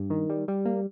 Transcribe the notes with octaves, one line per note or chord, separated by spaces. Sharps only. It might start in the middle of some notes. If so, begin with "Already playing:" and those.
Already playing: G2
D#3
G3
G3
A#3